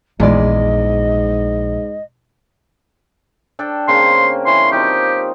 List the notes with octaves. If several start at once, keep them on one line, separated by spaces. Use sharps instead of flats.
A#1 E2 G#2 G#3 D5 D#5
D4 A4 G5
C#3 A#3 C4 C6
E3 C#5 C6
F3 C4 D#4 G4